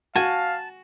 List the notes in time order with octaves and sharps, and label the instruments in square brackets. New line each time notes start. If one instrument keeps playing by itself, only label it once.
[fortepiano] F#4 [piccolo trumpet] F5 [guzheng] G#5 [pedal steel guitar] A5